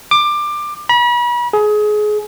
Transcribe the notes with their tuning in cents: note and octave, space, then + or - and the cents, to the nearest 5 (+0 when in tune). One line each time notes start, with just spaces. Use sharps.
D6 +20
B5 -40
G#4 +25